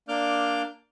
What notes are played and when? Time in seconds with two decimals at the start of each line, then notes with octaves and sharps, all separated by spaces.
0.08 A#3 D4 D5 D6 F6 G6